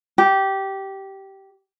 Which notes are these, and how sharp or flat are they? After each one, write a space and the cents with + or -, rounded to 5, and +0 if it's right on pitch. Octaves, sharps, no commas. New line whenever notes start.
G4 -15